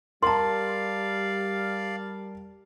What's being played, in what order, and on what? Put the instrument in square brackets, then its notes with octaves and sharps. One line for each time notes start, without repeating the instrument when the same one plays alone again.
[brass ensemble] G3 [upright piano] A#4 A5 [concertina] D5 F5 [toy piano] A#5 C6